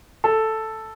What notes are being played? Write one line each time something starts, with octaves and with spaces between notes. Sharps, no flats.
A4